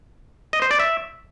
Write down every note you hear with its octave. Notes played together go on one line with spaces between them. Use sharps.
D#5
C5
D5
E5